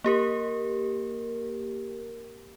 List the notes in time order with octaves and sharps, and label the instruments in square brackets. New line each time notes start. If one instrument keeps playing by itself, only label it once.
[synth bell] A#3 G4 A#4